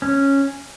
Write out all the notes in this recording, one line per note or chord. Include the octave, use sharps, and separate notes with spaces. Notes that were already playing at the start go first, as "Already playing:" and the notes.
C#4